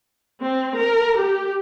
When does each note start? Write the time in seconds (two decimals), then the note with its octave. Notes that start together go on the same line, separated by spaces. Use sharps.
0.43 C4
0.79 A#4
1.18 G4